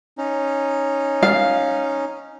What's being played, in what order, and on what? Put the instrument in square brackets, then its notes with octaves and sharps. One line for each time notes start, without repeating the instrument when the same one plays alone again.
[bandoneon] C#4 D#4
[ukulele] F5